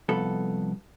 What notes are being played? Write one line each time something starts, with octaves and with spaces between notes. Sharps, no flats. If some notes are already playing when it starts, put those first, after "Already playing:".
C2 F2 B3 A4